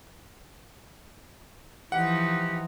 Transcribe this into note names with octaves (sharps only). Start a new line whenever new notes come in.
E3 F3 D#4 G4 F#5